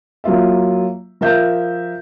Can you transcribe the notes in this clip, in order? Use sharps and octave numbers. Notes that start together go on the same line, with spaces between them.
F#3 A#3 F4 E5
F3 A#4 E5 G6